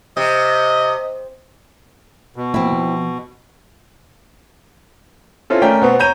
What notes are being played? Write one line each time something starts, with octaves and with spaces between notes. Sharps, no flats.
C3 D#5
B2
F3 A#3 C4 E4
F3
C4 C#4 E4 F4 A4
A3 C#4 A#4 D5 G5
B2 B3 C4
C#5 A#5 G6 D#7